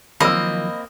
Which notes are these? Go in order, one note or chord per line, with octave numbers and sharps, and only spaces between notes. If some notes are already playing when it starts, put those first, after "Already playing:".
D#3 F3 F#3 A#3 C4 D#5 B5 E6